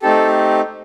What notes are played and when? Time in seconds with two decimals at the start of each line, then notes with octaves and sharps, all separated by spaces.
0.02 A3 C4 D#4 G4 A4